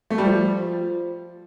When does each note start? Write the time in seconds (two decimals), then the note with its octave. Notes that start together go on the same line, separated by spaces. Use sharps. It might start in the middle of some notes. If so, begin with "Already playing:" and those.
0.10 A3
0.18 G3
0.26 F3